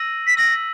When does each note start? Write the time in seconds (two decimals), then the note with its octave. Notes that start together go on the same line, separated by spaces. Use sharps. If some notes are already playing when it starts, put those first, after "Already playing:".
Already playing: E6 A#6 D#7 F#7
0.27 B6
0.37 E6 A#6 B6 F#7